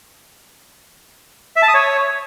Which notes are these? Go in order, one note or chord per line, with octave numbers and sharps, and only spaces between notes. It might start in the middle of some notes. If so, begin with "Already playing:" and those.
E5
A5
D#6
C#5